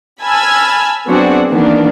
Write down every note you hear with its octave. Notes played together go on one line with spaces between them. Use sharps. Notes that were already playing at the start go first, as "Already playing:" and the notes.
G#5 A5 B5 E6 F6 G#6
F#3 B3 C4 D4 F#4 G#4
D#3 E3 A#3 B3 D4